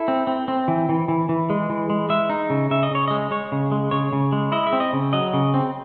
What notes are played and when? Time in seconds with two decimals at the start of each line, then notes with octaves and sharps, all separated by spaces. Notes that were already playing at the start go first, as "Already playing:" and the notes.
Already playing: E4 A4
0.08 C4
0.27 C4
0.48 C4
0.68 E3
0.89 E3
1.08 E3
1.29 E3
1.50 G#3
1.70 E3
1.90 G#3
2.09 G#3 E5
2.30 D#4
2.50 C#3
2.71 C#3 E5
2.83 D#5
2.91 C#3 C#5
3.08 D#5
3.11 G#3
3.31 G#3 C#5
3.52 C#3
3.72 G#3
3.91 C#3 C#5
4.13 C#3
4.32 G#3
4.52 E4 D#5
4.67 E5
4.73 C4
4.80 D#5
4.93 C#3
5.13 F#3 D#5
5.33 C#3
5.54 C4